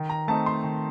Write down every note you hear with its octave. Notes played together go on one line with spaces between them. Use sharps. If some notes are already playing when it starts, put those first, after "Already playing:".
Already playing: D#3
A#5
A3 C4 D#4 A5
C6
D#3